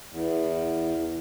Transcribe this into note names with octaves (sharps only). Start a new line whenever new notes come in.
E2